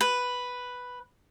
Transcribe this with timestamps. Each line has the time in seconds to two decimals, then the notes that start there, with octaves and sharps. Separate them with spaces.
0.01 B4